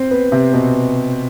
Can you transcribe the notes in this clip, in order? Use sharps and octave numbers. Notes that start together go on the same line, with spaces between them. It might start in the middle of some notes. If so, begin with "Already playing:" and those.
Already playing: C4 C5
B3 B4
C3 C4
B2 B3